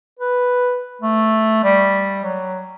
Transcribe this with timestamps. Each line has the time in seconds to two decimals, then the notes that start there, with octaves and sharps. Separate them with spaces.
0.19 B4
1.02 A3
1.64 G3
2.24 F#3